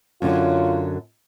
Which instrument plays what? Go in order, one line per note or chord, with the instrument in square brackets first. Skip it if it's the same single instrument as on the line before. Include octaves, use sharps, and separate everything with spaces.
[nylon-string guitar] F#2 D3 F#3 [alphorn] F4